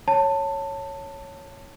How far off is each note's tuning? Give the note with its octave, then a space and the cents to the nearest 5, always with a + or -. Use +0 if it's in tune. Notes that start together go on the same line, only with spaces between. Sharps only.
C#5 +0 A5 +15